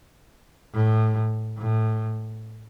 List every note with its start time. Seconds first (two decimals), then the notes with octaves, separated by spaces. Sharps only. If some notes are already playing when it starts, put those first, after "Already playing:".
0.74 A2
1.58 A2